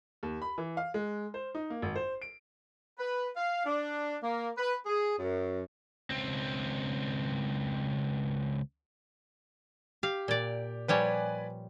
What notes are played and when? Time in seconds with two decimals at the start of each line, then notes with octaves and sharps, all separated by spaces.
0.23 D#2
0.42 B5
0.58 E3
0.77 F5
0.94 G#3
1.34 C5
1.55 D#4
1.70 A#3
1.82 G#1
1.96 C5
2.22 D7
2.99 B4
3.37 F5
3.66 D4
4.23 A#3
4.57 B4
4.86 G#4
5.19 F#2
6.10 C#2 C4
10.03 G4 F5
10.28 A#2 D5
10.88 F3 G3 B4 C#5 D5 G#5